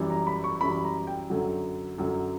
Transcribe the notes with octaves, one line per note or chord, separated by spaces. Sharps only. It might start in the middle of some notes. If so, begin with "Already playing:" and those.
Already playing: F#2 E3 G3
A#5
B5
C#6
F#2 E3 G3 B5
A#5
G5
F#2 D3 F#3
F#2 D3 F#3